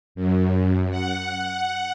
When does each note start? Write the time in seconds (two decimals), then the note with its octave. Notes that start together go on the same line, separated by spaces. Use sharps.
0.15 F#2
0.90 F#5